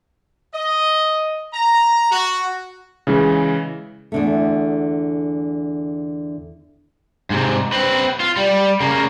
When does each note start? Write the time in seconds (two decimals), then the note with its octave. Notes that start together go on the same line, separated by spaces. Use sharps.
0.53 D#5
1.53 A#5
2.11 F#4
3.07 C#3 E3 G#3
4.12 E2 D3 A3
7.30 G#2 C3
7.72 C4 B4
8.20 F4
8.37 G3
8.80 C#3 A#3